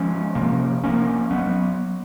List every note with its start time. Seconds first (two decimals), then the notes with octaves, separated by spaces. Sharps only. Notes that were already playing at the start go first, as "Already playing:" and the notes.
Already playing: F3 G#3 C#4
0.35 C3 F3 A#3
0.84 F3 A#3 C#4
1.31 F#3 B3